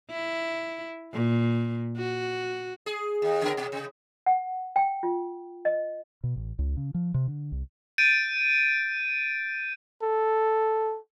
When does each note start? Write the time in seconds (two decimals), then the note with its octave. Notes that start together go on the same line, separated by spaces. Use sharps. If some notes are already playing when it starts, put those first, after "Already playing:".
0.11 E4
1.13 A#2
1.97 F#4
2.86 G#4
3.22 D#2
3.41 C#3 B3 A#4
3.57 B2
3.72 C3
4.26 F#5
4.76 G5
5.03 F4
5.65 D#5
6.24 B2
6.36 A1
6.59 C#2
6.77 C#3
6.94 F3
7.14 C3
7.28 D3
7.52 C2
7.98 G6 A6 D7 D#7
10.02 A4